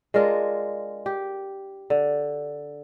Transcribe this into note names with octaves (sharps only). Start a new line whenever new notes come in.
G#3 D4 F4 A#4
G4
D3